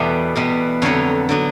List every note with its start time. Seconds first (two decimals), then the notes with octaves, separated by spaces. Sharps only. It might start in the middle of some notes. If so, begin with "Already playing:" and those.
Already playing: E2 B2 G3 A3 B3 D5
0.36 E2 B2 G3 B3
0.82 F2 D3 F#3 B3 C#5
1.29 D3 F#3 B3